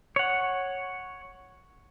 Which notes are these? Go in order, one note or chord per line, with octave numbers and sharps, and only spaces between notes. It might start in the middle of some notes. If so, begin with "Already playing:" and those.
C#5 F#5